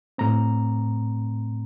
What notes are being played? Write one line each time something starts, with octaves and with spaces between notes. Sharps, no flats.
A2 A3 C4 A#5